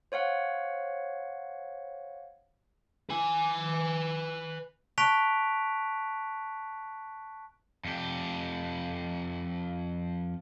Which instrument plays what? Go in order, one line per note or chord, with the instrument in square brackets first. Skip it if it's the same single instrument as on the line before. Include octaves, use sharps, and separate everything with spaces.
[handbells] C5 C#5 F5 F#5
[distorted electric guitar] B4 G#5
[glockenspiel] A5 C#6 F#6 B6 D7 F7
[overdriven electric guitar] F2 G4